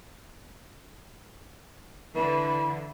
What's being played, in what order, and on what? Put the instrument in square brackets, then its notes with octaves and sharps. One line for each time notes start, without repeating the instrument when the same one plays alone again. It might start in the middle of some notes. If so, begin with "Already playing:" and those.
[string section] D3 [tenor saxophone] E3 [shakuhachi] B5